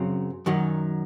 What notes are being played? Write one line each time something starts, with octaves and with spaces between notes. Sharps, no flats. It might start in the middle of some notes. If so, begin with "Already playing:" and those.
Already playing: F#2 C#3 F#3 C4
F#2 D#3 F#3